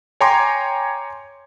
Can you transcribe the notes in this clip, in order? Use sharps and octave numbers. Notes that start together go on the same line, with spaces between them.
C#5 G5 G#5 A#5 C6 D6